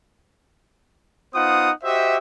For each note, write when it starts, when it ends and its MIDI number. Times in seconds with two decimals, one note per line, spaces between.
1.34 1.70 59
1.34 1.70 63
1.34 1.70 65
1.34 1.70 72
1.34 1.70 78
1.34 1.70 87
1.83 2.17 66
1.83 2.17 67
1.83 2.17 72
1.83 2.17 75
1.83 2.17 76